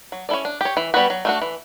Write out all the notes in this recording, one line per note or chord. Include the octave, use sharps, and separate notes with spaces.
F#3
C#4 E4 A4 D5
D4
G4 C#5
E3
G3 B3 F#4 B4
F#3
A3 D4 F#4
E3